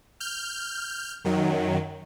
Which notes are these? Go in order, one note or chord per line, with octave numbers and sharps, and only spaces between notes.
F6 G6
F#2 D#3 F#3